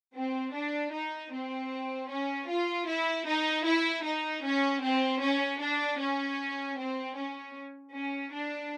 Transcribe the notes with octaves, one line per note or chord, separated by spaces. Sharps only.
C4
D4
D#4
C4
C#4
F4
E4
D#4
E4
D#4
C#4
C4
C#4
D4
C#4
C4
C#4
C#4
D4